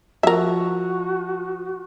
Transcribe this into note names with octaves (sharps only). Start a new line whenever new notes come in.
F3 F#4 A#4 E5